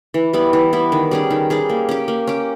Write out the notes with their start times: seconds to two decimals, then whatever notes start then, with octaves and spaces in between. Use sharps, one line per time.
0.14 E3
0.33 G3 B3 E4
0.53 E3
0.73 G3 B3 E4
0.92 D#3
1.11 G3 C#4 G#4
1.31 D#3
1.50 G3 C#4 G#4
1.70 A#3
1.89 C#4 G4
2.08 A#3
2.27 C#4 G4